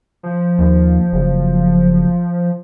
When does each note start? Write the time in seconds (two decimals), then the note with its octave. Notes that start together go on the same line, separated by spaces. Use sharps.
0.23 F3
0.59 D#2
1.13 F#1